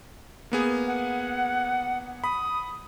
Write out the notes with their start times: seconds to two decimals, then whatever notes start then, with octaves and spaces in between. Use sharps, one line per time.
0.52 A#3 B3 G#4
0.87 F#5
2.24 B5 D#6